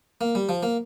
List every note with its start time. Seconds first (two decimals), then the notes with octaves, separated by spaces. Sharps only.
0.21 A#3
0.35 G3
0.49 F3
0.63 A#3